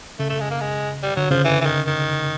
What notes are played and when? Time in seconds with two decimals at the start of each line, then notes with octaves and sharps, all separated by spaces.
0.19 C#3 A3
0.30 A3
0.40 G#3
0.51 A#3
0.61 G#3
1.03 G3
1.17 D3 F#3
1.31 C#3 F3
1.45 E3
1.61 E3
1.66 D#3
1.87 D#3